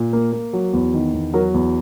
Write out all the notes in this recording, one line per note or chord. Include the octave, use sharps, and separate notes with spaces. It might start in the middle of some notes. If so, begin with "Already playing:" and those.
Already playing: A#2
A#3
A#3
F#3
E2
D#3
E2
F#3 A#4
E2